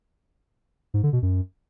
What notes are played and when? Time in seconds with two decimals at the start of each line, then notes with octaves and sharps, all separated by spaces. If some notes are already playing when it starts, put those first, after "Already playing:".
0.94 G#2
1.03 D3
1.13 B2
1.22 F#2